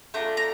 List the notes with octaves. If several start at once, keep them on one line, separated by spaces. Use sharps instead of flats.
A3 D4 F4 A#5
A#5